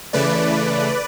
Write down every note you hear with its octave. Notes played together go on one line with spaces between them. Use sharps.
C#3 E3 A3 B4 D5